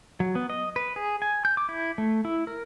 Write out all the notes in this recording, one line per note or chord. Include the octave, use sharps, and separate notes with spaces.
F#3
B3
D#5
B4
G#4
G#5
G6
D6
E4
A3
E4
A#4